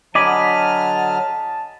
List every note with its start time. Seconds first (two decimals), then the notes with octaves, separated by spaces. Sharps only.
0.15 D3 F#3 D#5 G#5 A5 B5 D6 F6